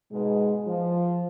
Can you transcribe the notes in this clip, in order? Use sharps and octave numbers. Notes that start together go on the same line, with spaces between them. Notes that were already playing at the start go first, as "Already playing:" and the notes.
G#2 B2 G#3
F3